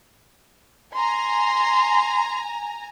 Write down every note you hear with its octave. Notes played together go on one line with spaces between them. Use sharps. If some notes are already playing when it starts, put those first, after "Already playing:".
G#5 A#5 C6